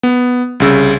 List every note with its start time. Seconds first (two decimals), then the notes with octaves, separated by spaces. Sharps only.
0.03 B3
0.60 C2 C#3 E6